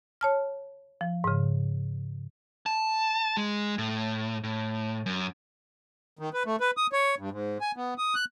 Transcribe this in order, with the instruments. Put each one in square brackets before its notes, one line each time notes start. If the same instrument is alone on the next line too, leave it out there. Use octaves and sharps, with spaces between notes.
[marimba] C#5 A5 F6
F3
G#2 C#3
[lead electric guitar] A5
G#3
A2
A2
F#2
[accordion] D#3
B4
A3
B4
D#6
C#5
G2
G#2
G#5
B3
D#6
F#6